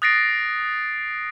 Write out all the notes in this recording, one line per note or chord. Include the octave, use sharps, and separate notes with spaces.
D#6 F#6 A6 A#6 C7 D7